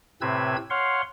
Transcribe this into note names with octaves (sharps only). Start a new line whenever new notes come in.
A2 C3 C4 B4 E6 G#6
C#5 F5 F#5 C6